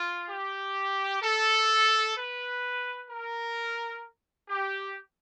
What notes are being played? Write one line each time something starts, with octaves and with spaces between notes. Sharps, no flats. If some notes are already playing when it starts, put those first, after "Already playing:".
Already playing: F4
G4
A4
B4
A#4
G4